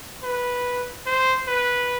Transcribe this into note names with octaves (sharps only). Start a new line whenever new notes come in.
B4
C5
B4